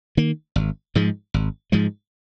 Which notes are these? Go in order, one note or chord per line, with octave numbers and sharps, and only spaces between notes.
D#3 A#3
G#1
G#2 F3 G#3
G#1
G#2 F3 G#3